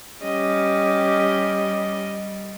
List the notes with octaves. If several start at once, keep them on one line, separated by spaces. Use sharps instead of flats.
G3 C#4 G4 D#5